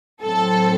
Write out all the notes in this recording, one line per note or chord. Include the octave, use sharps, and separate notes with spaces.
A2 F#3 C4 A4